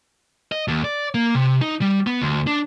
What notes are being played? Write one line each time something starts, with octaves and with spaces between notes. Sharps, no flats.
D#5
D#2
D5
A#3
C3
D#4
G3
B3
D2
D4